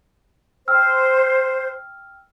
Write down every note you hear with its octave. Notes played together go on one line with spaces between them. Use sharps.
C5 G5 E6 F6